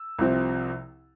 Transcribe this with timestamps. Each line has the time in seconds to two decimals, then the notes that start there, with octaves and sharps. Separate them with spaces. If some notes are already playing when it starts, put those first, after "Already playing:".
Already playing: E6
0.18 C2 C3 F3 C4